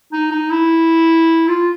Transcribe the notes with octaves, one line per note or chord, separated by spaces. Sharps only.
D#4
D#4
E4
F4